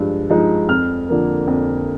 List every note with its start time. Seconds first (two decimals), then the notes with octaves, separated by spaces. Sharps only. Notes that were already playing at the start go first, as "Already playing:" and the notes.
Already playing: G2 F3 G#3
0.30 F3 G#3 D#4
0.69 F2 F6
1.09 D3 F3 A#3
1.48 F2